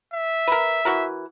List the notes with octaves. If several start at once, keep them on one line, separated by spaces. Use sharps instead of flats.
E5
A#4 B4
E3 F#4 A#4